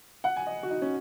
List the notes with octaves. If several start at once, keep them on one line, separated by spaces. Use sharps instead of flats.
F#5
G#5
D#5
F#4
D#4
C#4